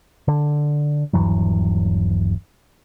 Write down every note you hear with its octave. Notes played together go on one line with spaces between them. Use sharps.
D3
D#1 G2 E3 F#3